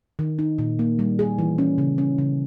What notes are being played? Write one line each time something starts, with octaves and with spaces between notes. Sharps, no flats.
D#3
D#4
A#2
A#3
G3
G#4
E3
C#4
C#3
C#4
C#3